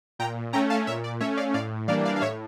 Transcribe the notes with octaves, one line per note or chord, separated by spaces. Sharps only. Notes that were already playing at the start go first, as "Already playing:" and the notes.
A#2 G5 A#5
A3 C#4 G5 A#5
F5 A5
A#2 C#5 E5
D5
A3 C#4 C#5 E5
D5 F5
A2 D5 F5
E3 G3 A#3 D4 D5 F5
D5 F5
F5
A2 C#5 E5